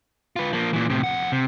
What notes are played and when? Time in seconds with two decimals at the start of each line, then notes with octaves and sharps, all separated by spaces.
0.36 F4 B4
0.53 F3 A#3
0.73 A#2 E3
0.90 A2 C3
1.04 F2 F#5
1.32 C3